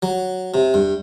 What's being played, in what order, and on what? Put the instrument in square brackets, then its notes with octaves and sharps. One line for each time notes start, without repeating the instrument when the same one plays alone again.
[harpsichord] F#3
C3
G2